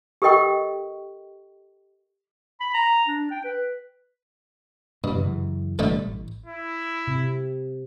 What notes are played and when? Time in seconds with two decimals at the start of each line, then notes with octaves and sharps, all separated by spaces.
0.22 G4 A4 A#4 D#5 G5 C#6
2.61 B5
2.74 A#5
3.08 D4
3.31 G5
3.44 B4
5.04 G2 B2 A#3
5.15 F#2 C#3 E3
5.79 A1 B2 D3 G3 A3 A4
6.07 A1
6.46 E4
7.08 C3